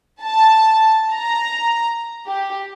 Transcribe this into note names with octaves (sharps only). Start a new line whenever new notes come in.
A5
A#5
G4